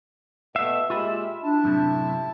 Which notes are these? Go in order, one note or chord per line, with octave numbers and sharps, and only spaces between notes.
B2 A3 B3 E5 F5
A#2 G#3 F4 G4 G#5 B5
D4 E4 A5
F#2 A2 C3